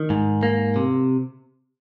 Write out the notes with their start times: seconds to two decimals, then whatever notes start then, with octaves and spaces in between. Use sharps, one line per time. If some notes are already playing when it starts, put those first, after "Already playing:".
Already playing: D#3
0.10 G#2
0.43 A#3
0.76 C3